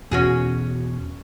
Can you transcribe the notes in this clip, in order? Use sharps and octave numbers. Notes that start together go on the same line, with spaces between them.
E2 B2 C#4 F#4 G#4